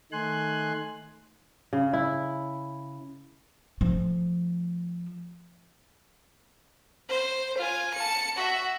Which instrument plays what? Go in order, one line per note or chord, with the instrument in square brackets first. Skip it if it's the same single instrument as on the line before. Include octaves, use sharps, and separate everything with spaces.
[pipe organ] D#3 A3 D#4 G#5 C6 F#6
[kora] C#3
E4
[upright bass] F3 A3
[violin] C5
F4 G#5
A5 C#7
F#4 E5